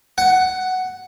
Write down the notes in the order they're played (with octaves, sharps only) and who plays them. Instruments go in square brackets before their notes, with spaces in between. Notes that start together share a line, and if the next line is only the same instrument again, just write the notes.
[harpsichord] F#5